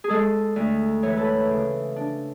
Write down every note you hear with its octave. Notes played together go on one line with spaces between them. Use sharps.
G#4
G#3 A4
D2
E3 C#5
B4
A4
B4
C#3
D4